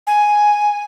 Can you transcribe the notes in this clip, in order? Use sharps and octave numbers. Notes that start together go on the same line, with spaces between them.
G#5